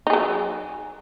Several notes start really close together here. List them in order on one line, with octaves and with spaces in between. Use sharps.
D#4 G#4 F#3